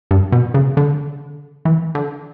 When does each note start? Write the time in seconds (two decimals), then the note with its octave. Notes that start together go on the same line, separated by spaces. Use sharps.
0.11 G2
0.32 B2
0.54 C#3
0.77 D3
1.65 E3
1.95 D3